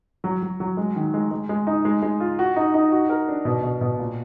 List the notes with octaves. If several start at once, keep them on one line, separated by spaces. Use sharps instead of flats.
F#3
F#3
F#3
G#3
D#3
G#3
G#3
G#3
D#4
G#3
G#3
F4
F#4
D#4
D#4
F#4
A#4
D4
B2
B2
B2
A#2